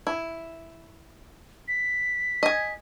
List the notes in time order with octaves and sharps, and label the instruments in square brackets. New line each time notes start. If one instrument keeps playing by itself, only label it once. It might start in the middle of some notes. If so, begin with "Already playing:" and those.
[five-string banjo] E4
[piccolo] B6
[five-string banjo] D#5 G#5